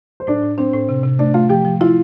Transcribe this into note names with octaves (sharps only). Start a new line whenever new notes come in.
C5
A2 D4 D5
A2
C4 D4 C5
A2
C3
C3
A3 D4 D5
A3 F4 F5
F3 G4 G5
F3
E4 F4 F5